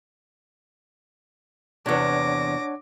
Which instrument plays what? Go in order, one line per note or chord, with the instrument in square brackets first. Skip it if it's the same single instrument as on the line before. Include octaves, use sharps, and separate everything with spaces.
[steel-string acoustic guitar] E2 C3 [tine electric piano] D4 C#5 F#5 [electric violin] D6 A#6